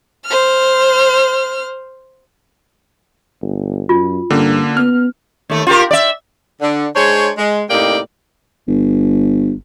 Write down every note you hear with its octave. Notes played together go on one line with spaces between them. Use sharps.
C5 F6
G1
F#2 F4
G2 D3 A#3 C#4
B3 F6
D#2 A3
F4 G4 A#4
D5 E5
D3
G#3 D4 C5 C#5
G#3
A2 C3 A#3 D#4 D5 G5
G1